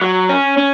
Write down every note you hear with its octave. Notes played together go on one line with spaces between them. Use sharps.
F#3
C#4
C#4